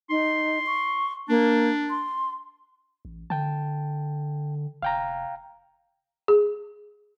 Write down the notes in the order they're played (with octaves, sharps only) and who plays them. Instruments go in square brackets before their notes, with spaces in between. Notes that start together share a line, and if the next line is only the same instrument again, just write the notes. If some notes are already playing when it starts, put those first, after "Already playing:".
[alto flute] D#4 [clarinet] C6
[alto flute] C#6
[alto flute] A#3 [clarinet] D4
[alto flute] C6
[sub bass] A1
[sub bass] D3 [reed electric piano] G5 A5
[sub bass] F1 [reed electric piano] F5 G5 A#5
[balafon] G#4